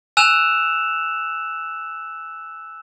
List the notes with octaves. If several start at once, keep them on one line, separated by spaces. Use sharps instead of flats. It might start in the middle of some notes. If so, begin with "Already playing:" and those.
G#5 E6 F#6 E7 F7